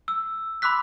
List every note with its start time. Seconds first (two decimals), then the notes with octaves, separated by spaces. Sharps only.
0.08 E6
0.62 B5 C6 D6 E6 F#6 B6